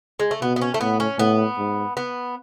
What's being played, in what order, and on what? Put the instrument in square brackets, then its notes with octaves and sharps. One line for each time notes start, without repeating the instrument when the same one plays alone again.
[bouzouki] G#3
A3
[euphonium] B2 [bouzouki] B3
[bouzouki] B3
C#4
A3
[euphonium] A2 [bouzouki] B3
[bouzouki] C#4
[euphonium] A2 [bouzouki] B3
[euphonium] G#2
[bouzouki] B3